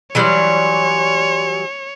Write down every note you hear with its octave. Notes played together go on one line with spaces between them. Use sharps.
E3 F#3 G3 C#5 D5 C6